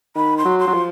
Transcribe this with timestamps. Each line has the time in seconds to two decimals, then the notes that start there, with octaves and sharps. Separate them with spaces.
0.16 D#3 B5
0.38 C6
0.45 F#3
0.59 C6
0.68 F#3
0.74 F3